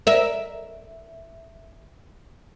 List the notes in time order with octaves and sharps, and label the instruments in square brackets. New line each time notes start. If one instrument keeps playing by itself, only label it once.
[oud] A#4 E5